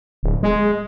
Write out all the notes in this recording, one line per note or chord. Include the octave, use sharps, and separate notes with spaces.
D1
G#3